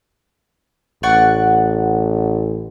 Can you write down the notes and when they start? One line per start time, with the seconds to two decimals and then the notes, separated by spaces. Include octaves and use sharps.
1.03 A1 D5 F#5 C#6